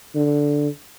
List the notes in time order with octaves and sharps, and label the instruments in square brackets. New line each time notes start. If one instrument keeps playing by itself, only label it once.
[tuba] D3